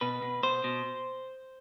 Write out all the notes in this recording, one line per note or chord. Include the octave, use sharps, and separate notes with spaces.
B2 B4
B2
B2 C5
B2